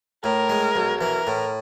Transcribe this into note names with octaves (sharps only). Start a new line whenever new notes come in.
A2 A#4
G#3
B1
E3 A#4
A2